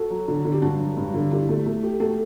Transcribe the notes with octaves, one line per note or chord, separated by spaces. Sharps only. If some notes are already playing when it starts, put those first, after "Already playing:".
Already playing: F#4 A4
F#3
D3
D3
G4
G2 D4 F#4
F#3
G2
D3
D3 E4 G4
A3
A3
G4
A3 F#4 A4